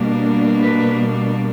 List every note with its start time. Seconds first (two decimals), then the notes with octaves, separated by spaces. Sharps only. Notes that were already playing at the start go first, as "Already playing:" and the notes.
Already playing: B2 G3 A#3 D4
0.61 B4